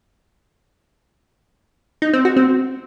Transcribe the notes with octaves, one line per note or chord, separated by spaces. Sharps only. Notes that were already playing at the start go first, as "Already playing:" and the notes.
D#4
C4
F#4
C4